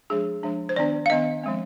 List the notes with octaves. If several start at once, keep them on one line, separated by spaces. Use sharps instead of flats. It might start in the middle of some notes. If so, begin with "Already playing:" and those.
F3 G#3 D4 G#4
F3 G#3 D4
C5
D#3 B3 D4 D5
F5
D#3 B3 D4 D#5
F3 G#3 C4